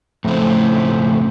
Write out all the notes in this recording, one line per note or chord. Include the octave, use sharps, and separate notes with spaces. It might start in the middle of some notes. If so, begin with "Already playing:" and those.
F2 A2 C#3 C4